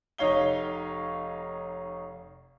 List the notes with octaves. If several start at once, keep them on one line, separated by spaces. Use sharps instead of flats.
F1 D#4 C#5 F5 G7